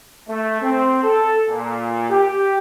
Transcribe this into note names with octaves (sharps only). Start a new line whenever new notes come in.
A3
C4
A4
A#2
G4